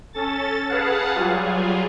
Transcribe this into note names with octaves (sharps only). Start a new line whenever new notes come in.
C#4 A4 A6
G#4 B4 F5 F#5 A5
F#3 G3 F4 G#4